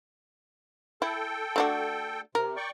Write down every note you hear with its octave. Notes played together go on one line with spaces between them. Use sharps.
E4 A4 G5
A3 D4 F#4
C3 A#4
D5 G5 C#6